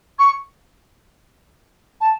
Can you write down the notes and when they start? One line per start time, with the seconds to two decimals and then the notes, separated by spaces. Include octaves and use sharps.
0.18 C#6
2.00 A5